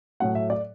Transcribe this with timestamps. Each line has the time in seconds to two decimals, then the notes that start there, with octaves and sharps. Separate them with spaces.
0.20 A2 F#3 A3 F#5
0.35 E5
0.50 D5